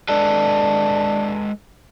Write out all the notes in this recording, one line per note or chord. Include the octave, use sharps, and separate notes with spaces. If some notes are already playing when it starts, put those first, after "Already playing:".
G#3 D4 A4 B4